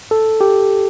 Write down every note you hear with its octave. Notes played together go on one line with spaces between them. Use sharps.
A4
G4